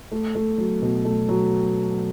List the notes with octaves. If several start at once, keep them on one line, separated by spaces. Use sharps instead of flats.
A3
A3
F#3
B2
A3
F#3